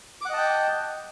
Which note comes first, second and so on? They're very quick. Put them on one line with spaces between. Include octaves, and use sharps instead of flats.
D6 F#5 D#5 A5 G5